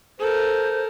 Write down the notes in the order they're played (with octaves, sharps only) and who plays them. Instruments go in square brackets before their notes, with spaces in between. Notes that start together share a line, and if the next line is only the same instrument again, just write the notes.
[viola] A4 A#4 [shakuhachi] C5